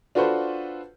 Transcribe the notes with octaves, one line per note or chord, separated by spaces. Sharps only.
D4 F4 F#4 A4 B4 C5